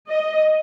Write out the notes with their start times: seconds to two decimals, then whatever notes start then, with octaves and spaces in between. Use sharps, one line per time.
0.09 D#5